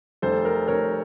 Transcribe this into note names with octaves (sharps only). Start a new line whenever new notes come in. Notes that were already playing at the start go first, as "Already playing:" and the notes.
F1 A4 C5
A#4
F1 A#4 C#5